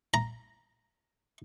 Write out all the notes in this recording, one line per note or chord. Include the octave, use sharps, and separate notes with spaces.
A#5